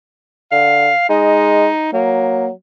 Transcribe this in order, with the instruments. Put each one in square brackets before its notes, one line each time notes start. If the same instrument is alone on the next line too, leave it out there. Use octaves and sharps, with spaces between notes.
[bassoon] D3 [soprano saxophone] F5
[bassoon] G#3 [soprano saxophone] D#4
[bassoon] F#3 [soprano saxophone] A#3